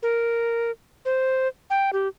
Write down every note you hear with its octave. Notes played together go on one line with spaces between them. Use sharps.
A#4
C5
G5
G4